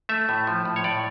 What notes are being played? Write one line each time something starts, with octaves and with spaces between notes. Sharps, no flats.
A3 E5
A2
F3
A2
C#5
A2 D5